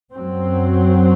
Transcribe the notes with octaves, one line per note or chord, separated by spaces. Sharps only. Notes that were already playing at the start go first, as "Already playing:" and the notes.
F#2 F#3 C4